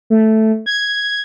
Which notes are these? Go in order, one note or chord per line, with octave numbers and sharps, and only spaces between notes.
A3
G#6